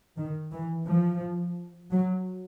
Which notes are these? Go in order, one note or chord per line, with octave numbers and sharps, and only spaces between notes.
D#3
E3
F3
F#3